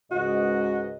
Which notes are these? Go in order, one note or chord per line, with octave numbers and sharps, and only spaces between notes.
C#2 G#2 F#4 D#5